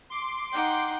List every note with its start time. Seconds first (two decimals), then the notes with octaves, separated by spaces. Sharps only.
0.10 C6 D6
0.52 D#4 F#5 G5